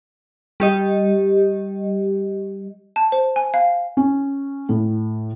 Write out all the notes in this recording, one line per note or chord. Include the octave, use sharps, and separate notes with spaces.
G3 G4 D#5
A5
C5
G#5
F5
C#4
A2